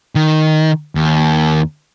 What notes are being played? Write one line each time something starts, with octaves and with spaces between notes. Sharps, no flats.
D#3
D#2